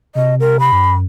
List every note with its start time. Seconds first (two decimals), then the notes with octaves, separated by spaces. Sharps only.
0.15 C3 D#5
0.40 A#4
0.60 B5
0.72 F#2